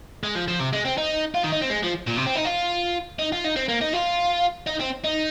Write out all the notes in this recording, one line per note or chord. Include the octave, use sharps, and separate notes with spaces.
G#3
F3
F3
C3
G#3
C4
D#4
F4
D#3
D#4
C4
G#3
F3
A#2
C3
C4
D#4
F4
D#4
F4
D#4
C4
A#3
D#4
F4
D#4
C4
D#4